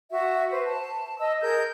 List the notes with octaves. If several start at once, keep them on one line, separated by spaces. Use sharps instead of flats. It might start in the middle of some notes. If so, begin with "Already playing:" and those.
F#4 E5
B4 C5
A5
D#5 E6
G#4 A#4 G6